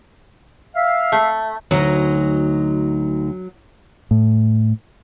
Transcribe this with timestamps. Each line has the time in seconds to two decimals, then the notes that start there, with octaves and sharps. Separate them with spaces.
0.75 E5 F5
1.12 A3
1.71 D2 F#3 D#4 D#5
4.11 A2